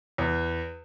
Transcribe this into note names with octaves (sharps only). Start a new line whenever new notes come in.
E2